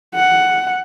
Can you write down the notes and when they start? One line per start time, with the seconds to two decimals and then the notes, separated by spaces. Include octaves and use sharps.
0.15 F#5